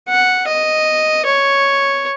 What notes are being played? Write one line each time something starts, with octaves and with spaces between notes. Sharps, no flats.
F#5
D#5
C#5